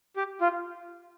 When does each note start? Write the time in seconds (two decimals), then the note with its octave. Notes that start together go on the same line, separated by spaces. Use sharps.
0.16 G4
0.41 F4